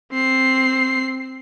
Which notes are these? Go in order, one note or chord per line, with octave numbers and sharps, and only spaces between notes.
C4 C7